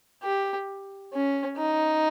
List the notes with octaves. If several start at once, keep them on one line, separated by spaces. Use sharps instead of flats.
G4
C#4
D#4